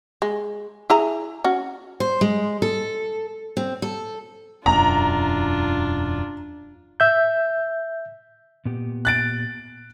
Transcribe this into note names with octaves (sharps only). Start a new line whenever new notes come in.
G#3
E4 G#4 A#5
C#4 F#4
C5
G#3
A4
C4
A4
E1 F#2 D4 F4 A#5
E5 G6
A#2 B3 G4
F#6 A6 D7